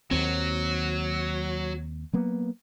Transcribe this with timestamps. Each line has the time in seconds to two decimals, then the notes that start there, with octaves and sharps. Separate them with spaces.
0.11 D#2 F#3 C4
2.13 F#3 A#3 B3